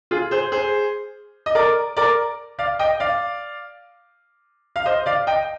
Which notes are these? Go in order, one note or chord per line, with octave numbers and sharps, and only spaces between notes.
F4 G#4
G#4 C5
G#4 C5
D#5
A#4 D5
A#4 D5
D5 F5
D#5 G5
D5 F5
F5
C5 D#5
D5 F5
D#5 G5